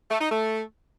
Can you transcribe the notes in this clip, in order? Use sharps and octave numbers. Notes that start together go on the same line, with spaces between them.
A3
D#4
A3